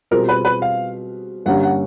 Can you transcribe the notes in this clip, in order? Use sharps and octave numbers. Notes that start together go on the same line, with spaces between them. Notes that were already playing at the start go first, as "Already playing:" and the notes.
B2 G3 C4 F4 G#4 A#4
B4
B4
F5
G2 D3 G3 A#3 C#4 F#5
F#5